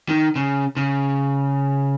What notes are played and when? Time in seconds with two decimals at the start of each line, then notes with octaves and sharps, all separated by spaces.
0.09 D#3
0.36 C#3
0.77 C#3